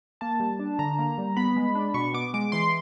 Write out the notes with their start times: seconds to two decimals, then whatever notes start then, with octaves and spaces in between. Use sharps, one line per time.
0.21 A#3 A5
0.40 G3
0.59 D4
0.79 D3 A#5
0.99 A#3
1.18 G3
1.37 B3 B5
1.56 G#3
1.75 D4
1.94 B2 C#6
2.14 B3 D6
2.34 G#3 D6
2.52 E3 C6